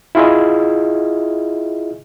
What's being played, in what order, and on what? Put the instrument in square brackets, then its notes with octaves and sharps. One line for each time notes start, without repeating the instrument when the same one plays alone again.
[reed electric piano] E4 F4 G#4 D#5 E5